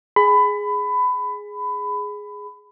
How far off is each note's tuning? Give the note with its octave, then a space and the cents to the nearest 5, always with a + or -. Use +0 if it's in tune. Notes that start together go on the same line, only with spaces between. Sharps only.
G#4 +0 B5 +20